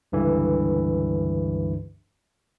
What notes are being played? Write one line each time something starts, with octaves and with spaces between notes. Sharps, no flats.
C#2 G2 D3 E3